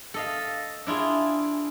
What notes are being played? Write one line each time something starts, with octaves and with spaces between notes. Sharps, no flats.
A4 D#5 F5
D4 E4 F4 G#4